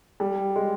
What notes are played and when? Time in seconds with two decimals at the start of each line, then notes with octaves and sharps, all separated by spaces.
0.20 G3
0.56 G#3